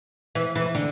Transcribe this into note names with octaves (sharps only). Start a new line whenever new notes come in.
E3
E3
D3